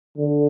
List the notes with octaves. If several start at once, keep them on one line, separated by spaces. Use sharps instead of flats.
D3